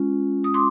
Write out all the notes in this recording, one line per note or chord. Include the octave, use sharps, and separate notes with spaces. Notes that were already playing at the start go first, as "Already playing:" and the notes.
Already playing: G#3 C#4 F4
D#6
C6 D6